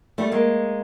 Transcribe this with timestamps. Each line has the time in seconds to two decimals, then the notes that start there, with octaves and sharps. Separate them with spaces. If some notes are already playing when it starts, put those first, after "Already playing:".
0.18 G3 A3
0.32 G#3 A#3